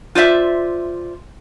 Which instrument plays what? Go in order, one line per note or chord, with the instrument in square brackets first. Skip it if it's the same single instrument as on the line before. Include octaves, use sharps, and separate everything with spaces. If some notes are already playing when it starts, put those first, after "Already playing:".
[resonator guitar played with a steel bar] F4 C5 D5 E5